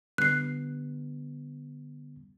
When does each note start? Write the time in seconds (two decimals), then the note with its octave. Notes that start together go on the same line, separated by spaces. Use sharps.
0.18 D3 G3 B3 F#6 C7